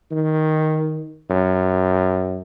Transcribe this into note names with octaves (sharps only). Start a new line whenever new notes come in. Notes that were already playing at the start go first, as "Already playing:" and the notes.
D#3
F#2